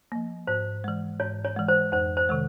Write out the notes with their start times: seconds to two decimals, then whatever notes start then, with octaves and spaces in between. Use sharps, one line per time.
0.12 F3 A#3
0.47 G#2 C5
0.84 E3 G#3
1.20 G#2 C#5
1.45 C#5
1.56 E3 G#3
1.68 C5
1.92 F2 C5
2.17 C5
2.29 C3 D#3 G#3